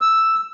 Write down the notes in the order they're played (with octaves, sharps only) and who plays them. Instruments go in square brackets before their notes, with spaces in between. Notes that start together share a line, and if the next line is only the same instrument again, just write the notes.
[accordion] E6